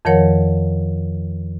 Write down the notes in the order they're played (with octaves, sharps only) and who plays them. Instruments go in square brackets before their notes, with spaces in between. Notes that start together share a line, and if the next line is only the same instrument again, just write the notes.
[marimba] F2 D#3 F3 A#4 C#5 F#5